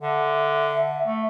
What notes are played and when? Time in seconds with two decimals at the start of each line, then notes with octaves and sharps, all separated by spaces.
0.02 D3 E5
1.06 A3